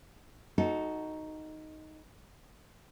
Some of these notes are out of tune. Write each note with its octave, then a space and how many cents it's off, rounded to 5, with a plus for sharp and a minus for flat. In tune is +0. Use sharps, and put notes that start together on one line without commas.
D#4 +0 F#4 +0 A4 -20